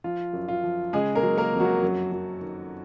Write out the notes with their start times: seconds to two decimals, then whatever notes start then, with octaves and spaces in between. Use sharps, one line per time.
0.04 F3 F4
0.33 F#2
0.48 F4
0.64 F3
0.93 C#3 G#3 G#4
1.15 A#3 A#4
1.23 F#3
1.38 A#3 A#4
1.52 F2
1.60 F#3 F#4
1.82 F#2
2.12 F#3
2.41 D#3